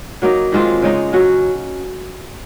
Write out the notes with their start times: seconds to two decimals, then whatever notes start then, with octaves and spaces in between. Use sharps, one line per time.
0.22 F#3 A#3 D#4
0.52 D#3 G#3 C4 F4
0.82 C#3 G#3 D#4
1.13 F#3 C#4 F#4